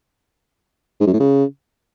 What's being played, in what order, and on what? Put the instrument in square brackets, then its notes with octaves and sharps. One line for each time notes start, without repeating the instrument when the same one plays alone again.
[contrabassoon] G#2
F#2
A2
C#3